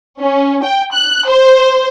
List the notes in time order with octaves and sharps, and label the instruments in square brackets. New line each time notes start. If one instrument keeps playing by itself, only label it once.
[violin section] C#4
G5
F#6
C5